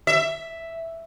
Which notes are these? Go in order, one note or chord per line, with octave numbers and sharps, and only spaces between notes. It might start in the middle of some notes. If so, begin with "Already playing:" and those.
E5